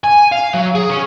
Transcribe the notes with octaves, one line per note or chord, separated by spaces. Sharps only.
G#5
F5
F#3
G#4
C#4